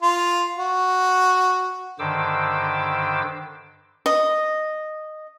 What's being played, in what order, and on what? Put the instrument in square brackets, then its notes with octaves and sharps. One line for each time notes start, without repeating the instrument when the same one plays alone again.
[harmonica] F4
F#4
[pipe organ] G2 D3 D#3 C5 D6 E6
[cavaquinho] D#5